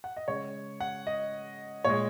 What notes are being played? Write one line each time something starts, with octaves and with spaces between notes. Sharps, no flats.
F#5
D#5
C#3 G#3 C#5
F#5
D#5
A#2 G#3 C#5